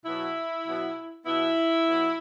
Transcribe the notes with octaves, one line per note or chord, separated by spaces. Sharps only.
B2 F#3 B3 E4
B2 F#3 B3
B2 F#3 B3 E4
B2 F#3 B3